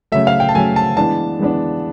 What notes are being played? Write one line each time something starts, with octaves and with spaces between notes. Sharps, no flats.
C#3 F#3 A3 E5
F5
G5
A5
C#3 F#3 A3 G#5
A5
E3 G#3 B3 D4 A5
E3 G#3 B3 D4